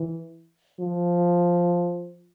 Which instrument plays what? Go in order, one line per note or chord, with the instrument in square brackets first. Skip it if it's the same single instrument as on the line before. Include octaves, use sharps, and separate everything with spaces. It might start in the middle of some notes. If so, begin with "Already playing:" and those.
Already playing: [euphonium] E3
F3